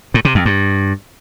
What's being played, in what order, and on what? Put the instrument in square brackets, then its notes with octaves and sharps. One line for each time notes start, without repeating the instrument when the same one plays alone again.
[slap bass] A2
C3
F2
G2